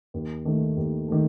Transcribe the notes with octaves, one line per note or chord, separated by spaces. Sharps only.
D#2
D#3 A3
D#2
D#3 A3